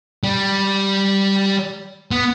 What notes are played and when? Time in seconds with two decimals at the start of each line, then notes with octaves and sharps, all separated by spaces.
0.24 G3
2.11 B3